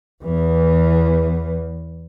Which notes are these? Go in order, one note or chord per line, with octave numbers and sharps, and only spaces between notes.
E2 E3